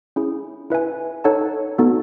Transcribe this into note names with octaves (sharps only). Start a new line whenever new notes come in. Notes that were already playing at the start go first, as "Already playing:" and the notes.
C#4 E4 G#4
E4 B4 E5 G#5
D#4 A4 C#5 F#5 A5
B3 D#4 F#4 A4